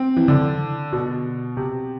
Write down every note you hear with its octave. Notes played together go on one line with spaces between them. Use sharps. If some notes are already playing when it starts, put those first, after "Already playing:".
Already playing: C4
E3
D3
B2
C3